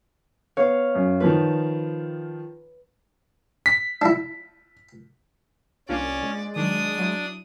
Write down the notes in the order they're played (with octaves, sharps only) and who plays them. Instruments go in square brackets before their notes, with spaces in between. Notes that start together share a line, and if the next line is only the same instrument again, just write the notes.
[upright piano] B3 [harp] C#5 F5
[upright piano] F#2
[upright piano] D#3 F3 F4 [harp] B4
[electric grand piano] B6
[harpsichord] D4 E4
[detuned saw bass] C2 [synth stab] A#3 D4 F4 [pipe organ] C#4 [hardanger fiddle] D5
[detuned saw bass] G#3
[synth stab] D#3 F#3 [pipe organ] D4 [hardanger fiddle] D#6
[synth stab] F#3 E4